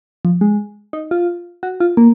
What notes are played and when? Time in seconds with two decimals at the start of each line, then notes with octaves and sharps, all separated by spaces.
0.25 F3
0.41 G#3
0.93 D#4
1.11 F4
1.63 F#4
1.80 F4
1.97 A#3